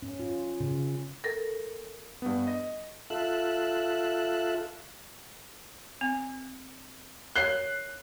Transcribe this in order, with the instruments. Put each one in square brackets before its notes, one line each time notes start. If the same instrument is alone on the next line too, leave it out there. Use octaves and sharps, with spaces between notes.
[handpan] C#4
F4
C#3
[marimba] A4 A#4
[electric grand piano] G2 B3
D#5 A#6
[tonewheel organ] F4 A4 E5 F#6
[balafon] C4
[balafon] A#4 C#5 [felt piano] F#6 C7